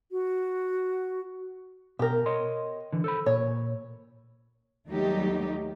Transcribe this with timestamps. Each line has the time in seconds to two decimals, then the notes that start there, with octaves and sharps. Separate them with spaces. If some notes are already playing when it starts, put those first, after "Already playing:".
0.12 F#4
1.99 B2 G4 A#4
2.26 C#5 D#5 C6
2.93 D3 E3
3.04 A4 C5 B5
3.26 A#2 C#5
4.88 D#2 F#3 G3 A3 D#4 G4